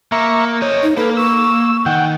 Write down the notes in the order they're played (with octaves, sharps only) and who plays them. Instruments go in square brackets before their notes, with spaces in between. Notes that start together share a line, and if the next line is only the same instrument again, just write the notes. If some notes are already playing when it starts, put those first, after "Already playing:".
[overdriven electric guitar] A#3 [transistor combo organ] E5 A#5 C#6
[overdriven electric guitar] C5 D#5 [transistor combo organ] C#5
[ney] D#4
[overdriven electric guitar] A#3 [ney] A4 [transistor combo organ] B4
[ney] C#6 [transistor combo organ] E6
[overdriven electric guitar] D#3 [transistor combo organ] F#5 G5